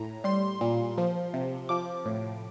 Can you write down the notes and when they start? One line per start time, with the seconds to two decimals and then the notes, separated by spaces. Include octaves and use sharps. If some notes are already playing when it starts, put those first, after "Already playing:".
Already playing: A2 A#5
0.24 G3 C6
0.61 A#2
0.98 F3
1.34 C3
1.69 F3 D6
2.05 A2